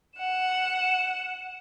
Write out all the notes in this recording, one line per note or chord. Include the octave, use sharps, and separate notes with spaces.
F#5 E7